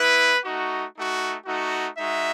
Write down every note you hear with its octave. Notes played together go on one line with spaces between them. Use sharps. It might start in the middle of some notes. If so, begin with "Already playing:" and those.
Already playing: B3 E4 B4
A3 D#4 F#4
A3 D#4 F#4
A3 D#4 F#4
G#3 D#4 F#4 E5